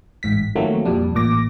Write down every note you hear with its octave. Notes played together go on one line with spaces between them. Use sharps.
A1 G#2 B6
D#3 F3 F#3 A3 A#3 C4
F2 A#2 G3 D4
A1 A#2 D6 A#6